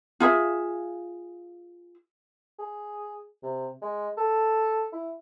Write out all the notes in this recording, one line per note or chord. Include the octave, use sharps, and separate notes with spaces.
F4 G#4 E5
G#4
C3
G#3
A4
E4